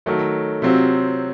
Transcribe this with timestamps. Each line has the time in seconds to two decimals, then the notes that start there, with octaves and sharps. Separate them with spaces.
0.06 D#3 F#3 A3
0.62 C3 F#3 C4 F4